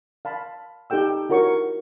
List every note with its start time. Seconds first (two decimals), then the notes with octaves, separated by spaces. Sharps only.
0.25 F5 A5 B5
0.90 D#4 G4 A4 G5 E6
1.29 E4 F#4 A#4 C#5 C#6